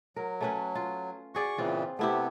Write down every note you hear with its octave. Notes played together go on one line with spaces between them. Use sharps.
F#3 A#4
A3 C#4 B4
F4
F#4 G#4 D5 C#6
A#2 C#3 E3 C4 F4
C3 A3 B3 E4 G4